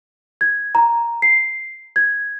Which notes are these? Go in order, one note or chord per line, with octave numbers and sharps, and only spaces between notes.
G#6
A#5
C7
G#6